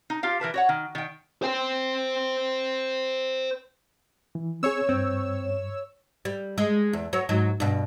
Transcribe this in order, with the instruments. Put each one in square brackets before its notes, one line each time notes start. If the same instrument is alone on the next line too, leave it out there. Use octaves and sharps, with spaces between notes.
[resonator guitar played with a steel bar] D#4
F4 G4 F5
E3 A#4 B4 A5
F#4 C#5 F#5
D#3
D#3 G5
[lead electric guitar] C5 G5
[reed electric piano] E3
[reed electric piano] C4 G#4 [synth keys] C#5 E6
[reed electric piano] G2 [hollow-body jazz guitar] C4
[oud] G3
G#3
E2
F#3 C#5
G#2 F#3
G2 B2